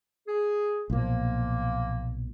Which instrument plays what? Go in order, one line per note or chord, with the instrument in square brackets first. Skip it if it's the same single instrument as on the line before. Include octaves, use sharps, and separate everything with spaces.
[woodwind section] G#4
[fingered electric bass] B1 A#2 [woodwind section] F3 A#3